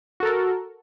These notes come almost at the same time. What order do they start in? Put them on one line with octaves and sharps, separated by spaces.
F#4 A4 A#4